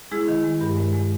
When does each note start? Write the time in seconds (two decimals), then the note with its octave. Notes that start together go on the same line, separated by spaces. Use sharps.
0.11 G#3 E4 G#4
0.28 D#3
0.44 G#3
0.61 G2 G4 A#4
0.77 G#3
0.93 G#3